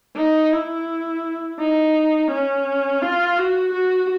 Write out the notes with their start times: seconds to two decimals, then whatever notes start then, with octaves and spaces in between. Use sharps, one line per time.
0.17 D#4
0.53 E4
1.59 D#4
2.31 C#4
3.02 F4
3.38 F#4
3.73 F#4